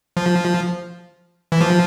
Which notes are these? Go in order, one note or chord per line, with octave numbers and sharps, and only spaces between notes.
F3
E3
F3